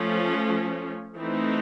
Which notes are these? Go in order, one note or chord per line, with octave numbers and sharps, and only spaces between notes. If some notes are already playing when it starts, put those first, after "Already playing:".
Already playing: F3 A3 C#4
E3 A3 C4 D#4